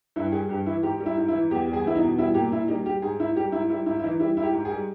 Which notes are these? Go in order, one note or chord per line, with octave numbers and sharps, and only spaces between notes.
G2 E4
G3 G#4
G2 G4
E3 E4
G#2 G4
G3
E4
G#2
E4
E3
E2 G4
G3
G#4
E2 E4
D#4
B2
G3 E4
A#2 G4
A#2 E4
G3 D#4
G3 G4
G#2 G#4
G#2 E4
G3 G4
G#2 E4
G3 E4
G#2 E4
E4
E3 D#4
G3 E4
G#2 E4
G4
G#2
G#4
G3